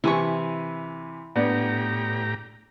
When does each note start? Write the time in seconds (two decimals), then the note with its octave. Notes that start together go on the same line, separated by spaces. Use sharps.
0.04 C3 E3 E4 G#5 C#6
1.36 A2 B3 D4 G4 A#5